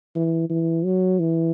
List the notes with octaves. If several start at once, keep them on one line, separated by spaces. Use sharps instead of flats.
E3
E3
F#3
E3